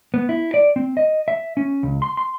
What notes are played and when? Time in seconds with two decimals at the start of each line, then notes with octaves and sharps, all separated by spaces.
0.14 B3
0.29 E4
0.54 D5
0.76 C4
0.97 D#5
1.28 E5
1.57 C#4
1.83 C#2
2.02 C6
2.17 C6